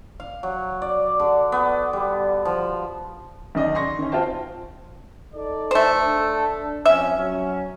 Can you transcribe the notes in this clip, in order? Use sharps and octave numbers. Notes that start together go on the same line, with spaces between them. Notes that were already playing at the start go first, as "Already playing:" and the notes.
F5
F#3
D5
D3
B3
G3
F3
B1 D#3 D5 D#5
C6 C#6 A#6
D#3 C#4
C4 F4 F#4 C5 G5 A5
D#4 A4 D5
A3 C5
D4 A4
F3 C4 C#4 E5
F#3 C#4